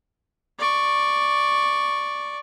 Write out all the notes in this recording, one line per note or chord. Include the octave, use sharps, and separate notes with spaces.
D5 C#6